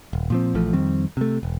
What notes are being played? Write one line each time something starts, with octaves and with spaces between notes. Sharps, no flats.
D#1
A#2 F3 C4
A#1 E3 F3 A3
F2 D#3 G3 C4
C3 A3
E1